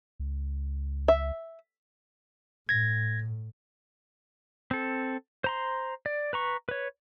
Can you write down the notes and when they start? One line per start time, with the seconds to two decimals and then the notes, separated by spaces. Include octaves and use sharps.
0.20 C#2
1.08 E5
2.69 A2 G#6 A#6
4.71 C4 A4
5.44 C5 A#5 C6
6.06 D5
6.33 B4 A#5 C#6
6.69 B4 C#5